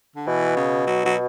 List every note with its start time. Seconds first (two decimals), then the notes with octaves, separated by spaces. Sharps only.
0.16 D3
0.27 B2 E3
0.56 C#3
0.87 F#3
1.06 F#3